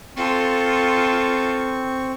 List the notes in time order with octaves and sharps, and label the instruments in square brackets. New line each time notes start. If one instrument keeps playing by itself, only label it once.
[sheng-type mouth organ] C4 C#6 [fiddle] F4 A4